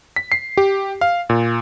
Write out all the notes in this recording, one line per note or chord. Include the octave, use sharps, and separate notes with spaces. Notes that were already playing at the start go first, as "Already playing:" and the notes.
B6
C7
G4
F5
A#2